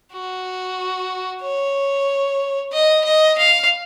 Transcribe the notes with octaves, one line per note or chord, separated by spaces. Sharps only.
F#4
C#5
D#5
D#5
F5